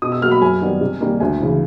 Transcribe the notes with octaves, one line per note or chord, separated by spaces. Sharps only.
B2 D#6
E6
F#3 A#3 F6
B5
F#2 G#5
D#3 G3 B3
C3
D#3 G3 A#3
D2 G#5
C#3 E3